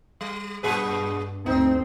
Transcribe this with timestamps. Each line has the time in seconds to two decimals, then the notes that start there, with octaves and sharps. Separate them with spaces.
0.21 G3
0.63 G2 A#2 G#4 B4
1.46 D2 C4 D#4